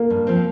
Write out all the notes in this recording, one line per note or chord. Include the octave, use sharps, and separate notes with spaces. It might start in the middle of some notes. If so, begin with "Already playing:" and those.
Already playing: A#3
G2
F3 C4